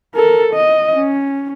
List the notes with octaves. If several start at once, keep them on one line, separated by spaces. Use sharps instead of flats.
A4 A#4
D#5
C#4